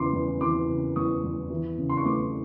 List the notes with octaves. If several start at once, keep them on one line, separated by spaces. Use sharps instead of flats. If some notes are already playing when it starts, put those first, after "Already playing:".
Already playing: E2 C#3 E3 C6 D6
E2
E3 C6 D6
C#3
E2 C#6 D#6
E2
E3
C#3
C6
C#6
A3 C6 D6